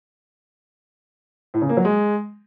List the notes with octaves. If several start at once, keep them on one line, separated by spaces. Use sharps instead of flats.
A2
C#3
A#3
F#3
G#3